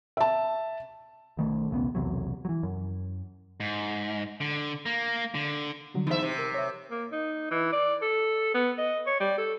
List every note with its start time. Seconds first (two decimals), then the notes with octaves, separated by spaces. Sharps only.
0.17 E5 A5
1.37 B1 D#3 A3
1.70 B1 E2 C#3 B3
1.95 B1 E2 C3 F#3
2.45 E3 F#3
2.63 F#2
3.60 G#2
4.41 D3
4.86 A#3
5.35 D3
5.94 D3 F#3 G3
6.07 E2 D#4 C5 E5
6.23 C3
6.39 A#4
6.54 C#5 E5
6.91 A#3
7.12 D#4
7.51 E3
7.72 D5
8.02 A4
8.54 B3
8.78 D#5
9.06 C#5
9.20 G3
9.38 A4